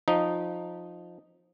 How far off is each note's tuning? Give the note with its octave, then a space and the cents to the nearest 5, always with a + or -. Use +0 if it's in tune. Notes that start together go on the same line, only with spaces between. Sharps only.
F3 +10 D#4 -10